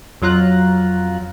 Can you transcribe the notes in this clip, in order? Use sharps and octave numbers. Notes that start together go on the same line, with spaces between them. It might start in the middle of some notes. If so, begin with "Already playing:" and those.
F2 F#3 F4 A#5 F#6